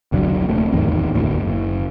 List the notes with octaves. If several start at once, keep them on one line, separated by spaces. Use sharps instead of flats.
F1 C2 D3 F#3
D#1 C3 A3
D1 G#1 E2 D#3
F#1 D2 A2
F#1